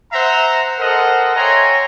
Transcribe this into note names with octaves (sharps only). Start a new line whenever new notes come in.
C5 E5 F#5 A#5
A4 A#4 C5 D#5 F#5
C#5 E5 G5 G#5 A#5 C6